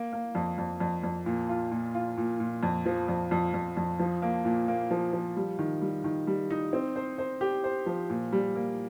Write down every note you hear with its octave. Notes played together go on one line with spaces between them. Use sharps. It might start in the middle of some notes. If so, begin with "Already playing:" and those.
Already playing: A#3
A#3
F2
F2
F2
F2
A#2
F4
A#2
F4
A#2
A#2
F2
F3
F2
F2
F2
F2
F3
A#3
A#2
A#3
F3
F3
G3
D#3
G3
D#3
G3
D#4
C4
C5
C5
G4
C5
F3
A#2
G3
A#3